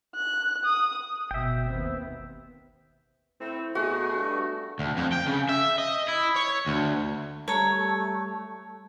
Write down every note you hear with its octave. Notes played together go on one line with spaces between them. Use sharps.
F#6
D#6
G1 B2 E5 G5
D#2 B3 C4
A2 A3 C4 E4
B2 A3 F#4 G#4
G2
D2
F2
G5
C#3
E5
D#5
E4
C#5
D2
G3 A3 C#5 A5 A#5